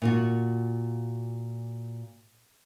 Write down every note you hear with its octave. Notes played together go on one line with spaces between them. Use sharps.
A#2 F4 F#4